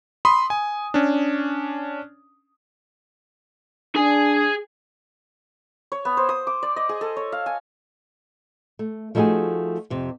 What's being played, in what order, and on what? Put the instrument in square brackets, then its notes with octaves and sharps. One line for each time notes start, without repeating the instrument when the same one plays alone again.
[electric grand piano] B5 C6 D#6
G#5
C#4 D4
[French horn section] D4 [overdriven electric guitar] G#4 G#5
[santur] C#5
B3
C5
D#6
D6
D5
D#5
G#4
A4
C#5
F5
G#5
[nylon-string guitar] A3
F3 A3 D#4 E4 F#4 G#4
F2 C3